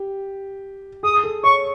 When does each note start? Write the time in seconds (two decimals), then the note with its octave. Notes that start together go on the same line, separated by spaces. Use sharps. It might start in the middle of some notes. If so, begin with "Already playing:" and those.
Already playing: G4
1.03 G#4 D#6
1.24 A4
1.43 C#5 C#6